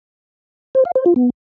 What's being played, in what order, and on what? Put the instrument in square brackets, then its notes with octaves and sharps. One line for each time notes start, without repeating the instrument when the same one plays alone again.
[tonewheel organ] C5
F5
C5
F4
B3